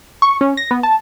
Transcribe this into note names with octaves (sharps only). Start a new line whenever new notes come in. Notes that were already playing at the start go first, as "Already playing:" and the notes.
C#6
C#4
A#6
B3
A5